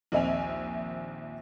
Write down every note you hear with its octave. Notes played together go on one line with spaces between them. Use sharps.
A#1 D#2 C4 E5 G#5 F7